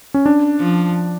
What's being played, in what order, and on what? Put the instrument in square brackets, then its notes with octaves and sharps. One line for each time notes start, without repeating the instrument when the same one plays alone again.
[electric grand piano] C#4
D4
[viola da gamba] F3